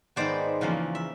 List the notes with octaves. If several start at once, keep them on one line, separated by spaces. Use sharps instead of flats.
G#2 D#3 G#3 B3 C5 D5
E2 C#3 F3 A#3
E5